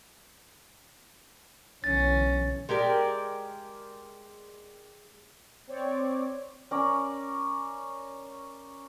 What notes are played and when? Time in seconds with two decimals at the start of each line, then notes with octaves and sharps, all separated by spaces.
1.84 B1 D3 E3 C#4 A6
2.69 G#3 G4 A#4 D5
5.67 C4 C#5 D5
6.71 C#4 A#4 D5